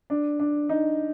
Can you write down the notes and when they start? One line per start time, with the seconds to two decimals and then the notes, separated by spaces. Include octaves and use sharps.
0.10 D4
0.40 D4
0.69 D#4